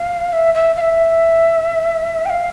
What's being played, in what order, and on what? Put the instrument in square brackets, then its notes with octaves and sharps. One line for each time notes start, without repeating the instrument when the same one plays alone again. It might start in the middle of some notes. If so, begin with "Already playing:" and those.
Already playing: [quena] F5
E5
E5
F5
E5
G5
F5